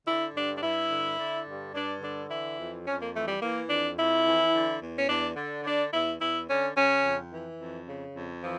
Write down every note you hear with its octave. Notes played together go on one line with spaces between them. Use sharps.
D3 E4
G2 D4
D4
G2 E4
D3
D3
G2
G2 D4
D3 D4
E3 E4
F2
F2 C#4
A#3
E3 A3
G3
E3 A#3
F2 D4
F2 E4
E3
D3
E2
C#4
E2 D4
D3
D3 D4
E2 E4
E2 E4
D3 C#4
C#3 C#4
F2
E3
F2
C#3
F2
E3 F3